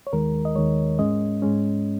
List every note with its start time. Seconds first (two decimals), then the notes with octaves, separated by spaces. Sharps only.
0.07 C#5
0.13 D#2 D#3 G#3 A#4
0.45 D#5
0.55 D#2 D#3 G#3 C#5
0.99 G#2 G#3 C#4 D#5
1.42 G#2 G#3 C#4